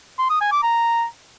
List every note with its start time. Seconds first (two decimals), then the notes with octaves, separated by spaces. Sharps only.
0.18 C6
0.29 D#6
0.41 G#5
0.52 D6
0.63 A#5